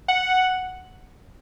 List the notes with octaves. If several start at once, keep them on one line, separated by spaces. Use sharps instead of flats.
F#5